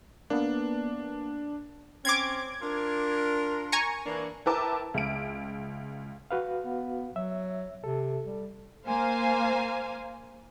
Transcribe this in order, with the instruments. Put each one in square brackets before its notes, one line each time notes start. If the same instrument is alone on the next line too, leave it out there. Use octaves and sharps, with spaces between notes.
[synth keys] A#3 B3 [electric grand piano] D4
[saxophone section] C4 C#4 [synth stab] D6 G#6
[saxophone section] D4 F4 A#4
[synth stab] G#5 A#5 C#6
[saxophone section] E3 A#3 D4
[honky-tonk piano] E4 A#4 B4 G5 A5 D6
C#2 E5 D7
[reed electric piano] F#4 B4 F5
[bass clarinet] B3
[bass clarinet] F#3 [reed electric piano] E5
[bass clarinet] C3 [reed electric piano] A4
[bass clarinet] G3
[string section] A#3 C5 F5 G#5